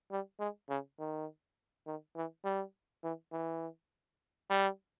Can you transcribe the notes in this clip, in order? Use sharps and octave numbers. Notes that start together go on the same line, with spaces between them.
G3
G#3
C#3
D#3
D#3
E3
G3
E3
E3
G3